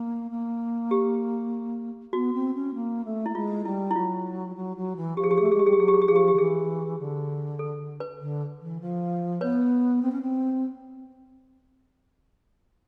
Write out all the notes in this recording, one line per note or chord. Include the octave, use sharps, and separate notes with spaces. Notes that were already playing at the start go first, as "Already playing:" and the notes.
Already playing: A#3
A#3
G4
B3 F#4
C4
C#4
A#3
A3
A3 E4
G#3 F4
G3 E4
E4
F#3 F4
F#3
F#3
E3
F3 G4
G#4
G4
G#4
A3 G4
G#3 G#4
G4
G3 G#4
G4
F#3 G#4
G4
G#4
G4
F3 G#4
G4
D#3 G4
E3 G#4
D3
A4
B4
D3
E3
F3
B3 B4 C#5
C4
C#4
C4